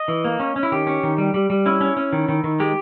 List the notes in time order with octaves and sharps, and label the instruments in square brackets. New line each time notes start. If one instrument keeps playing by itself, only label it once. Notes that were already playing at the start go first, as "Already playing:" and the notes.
Already playing: [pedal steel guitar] D#5
E3
A#3
C#4
C#4
E4
D#3 G4
C#4
D#3
G3
G3
G3
C#4 E4
C#4
C#4
D#3
D#3
D#3
G#3 G4